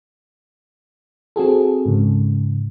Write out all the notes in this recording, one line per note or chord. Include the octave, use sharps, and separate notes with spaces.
C4 F#4 G#4 A4
G#2 C#3